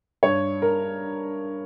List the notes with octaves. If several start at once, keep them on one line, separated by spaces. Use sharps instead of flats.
G2 C#5
A#4